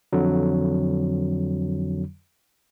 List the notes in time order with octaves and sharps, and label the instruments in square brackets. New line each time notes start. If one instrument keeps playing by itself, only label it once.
[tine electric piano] F2 D3 F#3